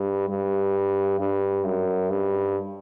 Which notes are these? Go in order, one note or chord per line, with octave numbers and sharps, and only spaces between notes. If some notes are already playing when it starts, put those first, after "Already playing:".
Already playing: G2
G2
G2
F#2
G2